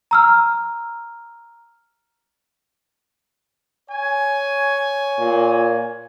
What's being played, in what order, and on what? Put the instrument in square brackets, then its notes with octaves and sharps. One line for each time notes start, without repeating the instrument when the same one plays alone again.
[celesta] A#5 E6 F6
[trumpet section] C#5 G#5
[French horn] A#2